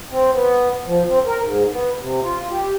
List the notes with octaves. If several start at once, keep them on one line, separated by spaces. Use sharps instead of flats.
C4
B3
F3
C4
A#4
G#2
B3
C3
F4
G4